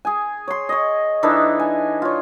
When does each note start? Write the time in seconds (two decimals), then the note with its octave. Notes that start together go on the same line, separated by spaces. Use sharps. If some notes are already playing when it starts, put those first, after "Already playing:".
0.05 G#4 G#5
0.48 C#5 C6
0.69 C#5 D#5
1.23 E3 D4 D#4 A4
1.60 G#5
2.02 F4 C#5